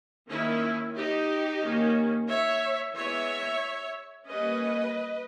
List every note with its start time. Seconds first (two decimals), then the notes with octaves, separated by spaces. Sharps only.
0.28 D#3 A#3 C#4 E4
0.94 D#4 G4
1.61 D#3 A#3 C#4
2.27 C#5 E5
2.94 E3 G#3 B3 C#5 E5
4.27 G3 A#3 C#4 B4 D#5